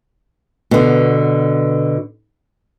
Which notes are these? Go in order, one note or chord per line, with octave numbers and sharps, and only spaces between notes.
B2 D3